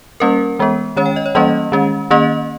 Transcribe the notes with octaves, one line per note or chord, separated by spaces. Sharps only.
G3 A#3 C#4 A#4
E3 G#3 B3
D#3 G#3 C#4 C#5
G5
D#5
C#5
E3 G3 A#3 C#4 D#5
D#3 G#3 C#4
D#3 A#3 C#4 D#5